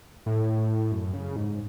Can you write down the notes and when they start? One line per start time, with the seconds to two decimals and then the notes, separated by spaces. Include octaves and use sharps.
0.26 A2
0.92 F#2
1.14 C#3
1.36 G#2